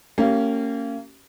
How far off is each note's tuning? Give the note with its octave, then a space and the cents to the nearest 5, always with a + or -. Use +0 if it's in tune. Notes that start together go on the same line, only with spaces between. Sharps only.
A#3 -30 C#4 +0 G4 -25